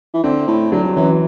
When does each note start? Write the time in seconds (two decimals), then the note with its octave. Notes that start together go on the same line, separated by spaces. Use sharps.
0.14 E3
0.24 D3 C4
0.48 A2
0.72 D3 F#3
0.84 G2
0.96 F#2 E3